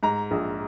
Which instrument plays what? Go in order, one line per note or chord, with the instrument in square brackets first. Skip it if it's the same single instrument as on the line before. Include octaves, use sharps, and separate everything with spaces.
[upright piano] G#2 A#5
A#1